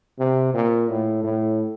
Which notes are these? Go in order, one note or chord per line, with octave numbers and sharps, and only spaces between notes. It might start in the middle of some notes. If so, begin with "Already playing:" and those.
C3
A#2
A2
A2